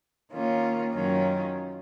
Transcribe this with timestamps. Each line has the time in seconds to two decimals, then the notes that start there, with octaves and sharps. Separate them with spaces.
0.31 D#3 A#3 C#4 F4
0.92 F#2 D#3 F#3 C#4 F4